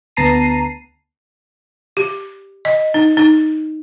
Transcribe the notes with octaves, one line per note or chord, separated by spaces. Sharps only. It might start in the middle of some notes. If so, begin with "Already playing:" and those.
D2 B3 A5 A#5 C7 D#7
G4
D#5
D#4
D#4